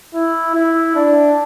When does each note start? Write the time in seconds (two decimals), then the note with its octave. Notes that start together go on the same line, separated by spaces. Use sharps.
0.14 E4
0.55 E4
0.96 D4